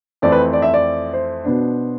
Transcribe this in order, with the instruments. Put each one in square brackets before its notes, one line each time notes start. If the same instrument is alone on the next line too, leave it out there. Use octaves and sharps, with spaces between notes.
[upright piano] F2 E3 A3 C4 D5
B4
D5
E5
D5
C5
B2 B3 D4